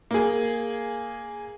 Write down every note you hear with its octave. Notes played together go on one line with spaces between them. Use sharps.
A#3 G#4